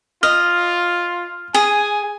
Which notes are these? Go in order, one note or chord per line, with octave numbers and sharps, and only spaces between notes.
F4 D#5 F6
G#4 G#5